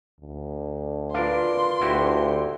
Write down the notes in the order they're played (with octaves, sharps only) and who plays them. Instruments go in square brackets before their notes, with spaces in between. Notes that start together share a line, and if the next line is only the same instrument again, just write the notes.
[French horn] D2
[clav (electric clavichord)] D4 A#4 D5 [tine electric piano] F4 B4 F5 [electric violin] C6
[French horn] D2 [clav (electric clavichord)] E4 F#4 G4